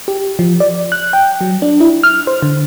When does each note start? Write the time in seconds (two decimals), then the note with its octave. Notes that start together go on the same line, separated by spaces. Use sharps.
0.08 G4
0.39 F3
0.60 D5
0.92 F#6
1.13 G5
1.41 F#3
1.62 D4
1.80 E4
2.03 F6
2.27 C5
2.42 D3